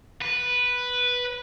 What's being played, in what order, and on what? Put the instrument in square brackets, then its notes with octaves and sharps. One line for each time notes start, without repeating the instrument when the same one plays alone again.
[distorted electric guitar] B4